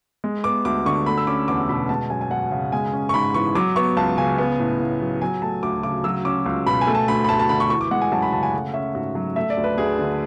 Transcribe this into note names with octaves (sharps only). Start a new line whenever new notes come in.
G#3
B3 D6
D2 D6
D3 C#6
A3 B5
E6
C#4 D6
E2 D6
B2 B5
G#3 A5
F#2 G#5
G#5
F#2 F#5
C#3
G#3 G#5
C#4
C#6
G#2 B5
E3 C#6
F#3 D6
B3 C#6
C#2 A5
C#3 G#5
B3
A2
A2
F#3
F#3 G#5
A3 A5
D2 D6
C#3 D6
F#3 E6
C#4 D6
C#2
B2 B5
G#5
A3
A5
D2 B5
B5
D2 A5
A5
D3 B5
C#6
E3 C#6
D6
G#3 F#5
G#5
F#2 A5
B5
C#3 A5
G#5
A3 F#5
C#4 E5
G#2 F#4
F#3
A3 E5
D5
D2
B4
D2 G#4
D3